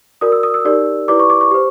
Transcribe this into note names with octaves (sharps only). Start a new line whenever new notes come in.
F#4 A#4 D5 D#6
E6
D#6
E6
D#4 G4 A#4 D5
E4 G4 B4 D5 D6
C#6
D6
C#6
G4 C5